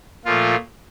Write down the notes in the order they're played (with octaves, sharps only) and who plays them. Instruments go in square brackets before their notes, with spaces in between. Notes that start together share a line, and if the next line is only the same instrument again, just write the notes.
[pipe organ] A#2 F3 A3 F4